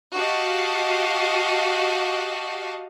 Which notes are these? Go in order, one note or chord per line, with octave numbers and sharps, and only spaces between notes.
F#4 G4 D#5 F5 A5